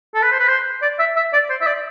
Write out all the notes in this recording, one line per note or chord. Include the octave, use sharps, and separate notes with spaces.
A4
B4
C5
B4
C5
D5
E5
E5
D5
C5
E5
D5